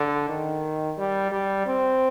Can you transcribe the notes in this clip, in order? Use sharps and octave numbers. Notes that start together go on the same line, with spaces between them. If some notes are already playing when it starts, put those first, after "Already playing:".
Already playing: D3
D#3
G3
G3
C4